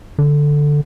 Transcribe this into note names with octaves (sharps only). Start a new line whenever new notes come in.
D3